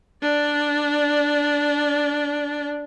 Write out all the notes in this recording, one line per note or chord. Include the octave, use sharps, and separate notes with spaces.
D4 D5